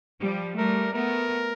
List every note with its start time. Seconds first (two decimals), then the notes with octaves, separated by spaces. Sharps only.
0.21 F3 G3
0.57 G3 A3 A#4
0.93 A3 B3 A#4